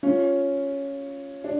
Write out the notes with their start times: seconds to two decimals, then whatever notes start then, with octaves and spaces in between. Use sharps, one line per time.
0.03 C#4 F4
1.44 D4